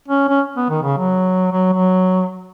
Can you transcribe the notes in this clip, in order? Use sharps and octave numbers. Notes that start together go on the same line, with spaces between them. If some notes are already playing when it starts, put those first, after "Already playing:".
C#4
C#4
B3
D#3
C#3
F#3
F#3
F#3